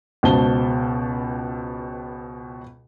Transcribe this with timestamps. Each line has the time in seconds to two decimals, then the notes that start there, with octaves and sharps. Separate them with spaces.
0.23 C#2 B2 C5 A5 G7